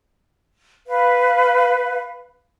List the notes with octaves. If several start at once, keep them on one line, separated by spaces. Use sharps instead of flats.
B4 F5